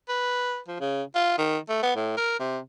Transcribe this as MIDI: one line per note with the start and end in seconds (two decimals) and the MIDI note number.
0.09 0.59 71
0.68 0.78 53
0.80 1.03 49
1.15 1.38 65
1.38 1.58 51
1.69 1.82 57
1.83 1.91 59
1.96 2.14 45
2.17 2.38 70
2.40 2.59 48